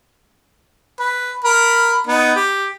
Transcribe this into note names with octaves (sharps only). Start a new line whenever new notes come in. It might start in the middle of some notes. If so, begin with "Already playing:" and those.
B4
A#4 B5
B3 D#4
G4